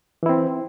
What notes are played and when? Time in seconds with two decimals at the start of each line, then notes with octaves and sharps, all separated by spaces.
0.23 E3
0.26 E4
0.29 C4